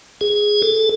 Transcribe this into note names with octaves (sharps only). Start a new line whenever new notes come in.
G#4
A4